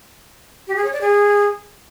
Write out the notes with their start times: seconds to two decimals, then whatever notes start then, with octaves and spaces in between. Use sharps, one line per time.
0.68 G4
0.76 G#4
0.84 C#5
0.93 D5
1.01 G#4